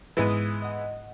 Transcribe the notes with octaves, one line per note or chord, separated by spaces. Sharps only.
G#2 E3 G#3 B3 D#6
D#5 F#5